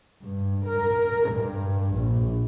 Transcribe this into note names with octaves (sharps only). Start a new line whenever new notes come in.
G2
A#4
G2
A#1